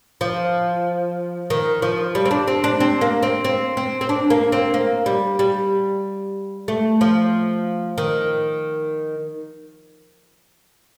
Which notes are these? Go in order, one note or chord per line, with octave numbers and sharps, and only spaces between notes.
F3
D#3
F3
G3
C4
D4
C4
D4
C4
A#3
C4
C4
C4
C4
D4
A#3
C4
A#3
G3
G3
A3
F3
D#3